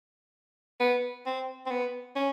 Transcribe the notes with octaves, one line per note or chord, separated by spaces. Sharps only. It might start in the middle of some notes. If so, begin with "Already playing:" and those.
B3
C4
C4
B3
C#4